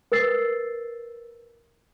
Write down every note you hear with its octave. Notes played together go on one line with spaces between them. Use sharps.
A#4 B4 E6 A6 C7